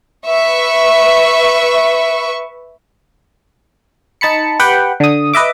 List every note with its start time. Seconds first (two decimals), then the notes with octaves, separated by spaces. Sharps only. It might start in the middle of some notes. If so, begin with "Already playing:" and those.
0.27 B4 E5 C#6
4.21 D#4 A5 B5 C#7
4.59 G4 B4 F#5 G5
5.00 D3 D#6
5.34 B4 D#5 E5 D6